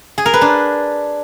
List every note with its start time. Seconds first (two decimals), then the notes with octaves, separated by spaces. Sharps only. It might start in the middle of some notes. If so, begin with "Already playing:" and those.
0.18 G#4
0.26 A#4
0.34 B4
0.41 D4